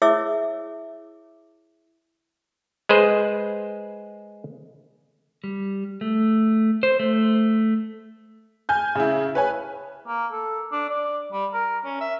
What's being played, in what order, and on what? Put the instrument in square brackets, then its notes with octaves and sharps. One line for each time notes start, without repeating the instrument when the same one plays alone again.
[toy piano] E4 G#4 C#5 E5 D6 E6
[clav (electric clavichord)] G#3 G#4 B4 C5
[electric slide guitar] G3
A3
C5
A3
[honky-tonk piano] G#5 F6 G6
C#3 E4
B4 C#5 G#5
[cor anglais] A#3
A4
D4
D5
G3
A#4
C#4
E5